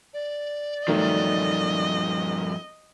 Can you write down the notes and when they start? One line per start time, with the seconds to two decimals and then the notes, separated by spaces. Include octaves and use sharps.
0.13 D5
0.88 G2 D#3 F3 F#3 A3 D#5